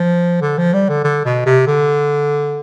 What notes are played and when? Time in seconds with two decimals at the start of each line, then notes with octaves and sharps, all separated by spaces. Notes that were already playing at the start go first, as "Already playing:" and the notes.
Already playing: F3
0.42 D3
0.58 F3
0.74 G3
0.89 D3
1.04 D3
1.25 B2
1.46 C3
1.67 D3